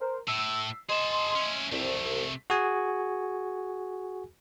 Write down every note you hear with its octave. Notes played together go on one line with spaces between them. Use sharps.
A#4 C5
A2 E6
G#4 D#5 A5 C6
C#4 E4
C2 C3 A3
F#4 G#4 G#5